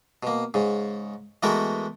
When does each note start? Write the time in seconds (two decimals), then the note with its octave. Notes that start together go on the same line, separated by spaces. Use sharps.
0.23 B2 A#3
0.54 G#2 C#3
1.43 E3 G#3 A3 B3 F#4 A#4